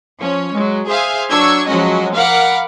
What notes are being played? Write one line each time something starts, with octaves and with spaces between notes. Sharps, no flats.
F3 C#4 C#5
F#3 G#3
G#4 C5 E5 F5 G#5
F#3 D4 C#6 E6 G#6
F3 F#3 G#3 C#4 F#4 D#5
A#4 F5 F#5 B5 D6